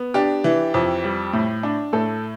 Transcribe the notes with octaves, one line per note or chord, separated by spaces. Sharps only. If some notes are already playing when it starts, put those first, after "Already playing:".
Already playing: B3
D4 G4
E3
F2
G3
A2
D4
A2 A4